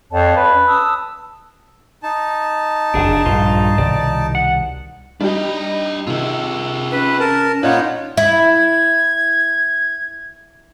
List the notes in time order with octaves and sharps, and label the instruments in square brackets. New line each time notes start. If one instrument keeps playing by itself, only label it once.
[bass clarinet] F2 [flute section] C#5 F5 A5
[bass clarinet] B4
[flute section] C#4
A5 D#6 E6
[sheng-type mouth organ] D#4 A5
[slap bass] F#1 F2 [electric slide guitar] D4 G#4
[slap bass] A#1 [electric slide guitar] G2 F4
[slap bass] C2 B2 D#3 [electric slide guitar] D5
[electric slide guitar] F#5
[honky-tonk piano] G3 D#4 G4 [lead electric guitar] D4 D#5
[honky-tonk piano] C3 D#3 [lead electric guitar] F4 G#4
[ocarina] C#4 [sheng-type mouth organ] B4
[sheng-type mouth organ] A#4 A5
[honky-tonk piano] A#2 D5 F#6 [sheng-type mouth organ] D#4 F4 C#5 [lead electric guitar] B4 F#5
[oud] E4 [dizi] G#6